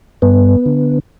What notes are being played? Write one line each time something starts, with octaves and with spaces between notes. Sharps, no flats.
G2 B3
D3